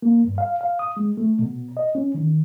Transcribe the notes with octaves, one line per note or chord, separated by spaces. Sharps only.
A#3
G2
F5
F5
D#6
G#3
A3
B2
D#5
C#4
D#3